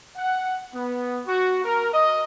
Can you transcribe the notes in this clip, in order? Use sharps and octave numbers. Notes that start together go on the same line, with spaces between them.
F#5
B3
F#4
A#4
D#5